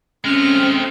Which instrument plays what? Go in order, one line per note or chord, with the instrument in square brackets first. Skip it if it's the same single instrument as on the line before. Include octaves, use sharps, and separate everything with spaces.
[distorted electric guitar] G#3 A3 [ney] C4 [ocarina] C#4 [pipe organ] F6